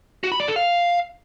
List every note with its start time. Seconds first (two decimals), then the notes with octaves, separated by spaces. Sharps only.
0.24 F#4
0.32 B5
0.40 D5
0.48 A4
0.56 F5